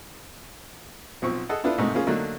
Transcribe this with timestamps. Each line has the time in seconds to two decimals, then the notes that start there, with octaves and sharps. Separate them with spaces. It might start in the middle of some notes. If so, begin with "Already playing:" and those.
1.22 B1 F3 C4 C#6
1.49 G#4 A4 D#5 F#5
1.64 B3 D4 E4 F4 A4 B4
1.78 G#2 C3 A3 A#3 D#4
1.94 F3 A#3 C#4 F4 G#4
2.07 D3 F#3 A3 A#3 D#4